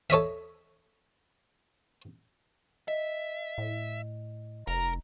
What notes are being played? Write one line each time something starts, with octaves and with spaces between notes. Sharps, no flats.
A4 C#5 D#5 E5
D#5 E5
A2
F1 A#4 A#5